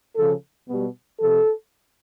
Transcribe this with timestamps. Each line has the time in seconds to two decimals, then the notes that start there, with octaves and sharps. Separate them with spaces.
0.15 C#3 F3 A4
0.68 B2 G3
1.20 C3 F3 A4